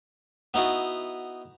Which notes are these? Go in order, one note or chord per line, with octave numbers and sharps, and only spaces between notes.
B3 D#4 E4 F#4